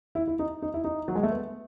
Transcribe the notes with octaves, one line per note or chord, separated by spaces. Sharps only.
E4
E4
D#4
D#4
E4
D#4
F#3
G#3
A3
B3